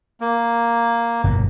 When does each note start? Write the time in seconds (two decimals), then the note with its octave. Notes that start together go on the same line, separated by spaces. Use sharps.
0.21 A#3
1.24 G1 F2 B2